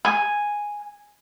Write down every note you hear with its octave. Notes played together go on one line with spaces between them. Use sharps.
G#5